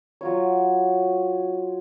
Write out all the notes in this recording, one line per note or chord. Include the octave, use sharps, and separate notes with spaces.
F#3 F4 C#5